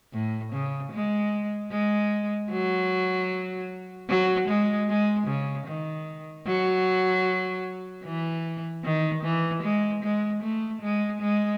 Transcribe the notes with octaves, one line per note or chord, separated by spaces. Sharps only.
A2
C#3
G#3
G#3
F#3
F#3
G#3
G#3
C#3
D#3
F#3
E3
D#3
E3
G#3
G#3
A3
G#3
G#3